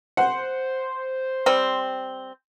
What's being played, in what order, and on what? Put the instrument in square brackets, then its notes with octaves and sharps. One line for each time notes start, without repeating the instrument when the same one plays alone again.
[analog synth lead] C5 [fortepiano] F#5
[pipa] G3 C4